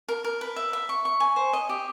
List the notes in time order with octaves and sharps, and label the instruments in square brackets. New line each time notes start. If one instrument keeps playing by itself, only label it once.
[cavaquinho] A#4
A#4
B4
E5
E5
C#6
C#6
G#5
C5
D#5
G4